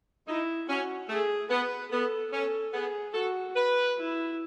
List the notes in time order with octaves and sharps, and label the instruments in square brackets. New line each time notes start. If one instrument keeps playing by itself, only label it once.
[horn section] D#4 [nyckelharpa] E4
[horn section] C#4 [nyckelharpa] F#4
[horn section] A3 [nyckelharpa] G#4
[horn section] B3 [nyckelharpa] B4
[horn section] B3 [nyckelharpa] A4
[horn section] C#4 [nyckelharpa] A4
[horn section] B3 [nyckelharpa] G#4
[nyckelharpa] F#4 [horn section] A4
[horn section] B4
[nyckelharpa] E4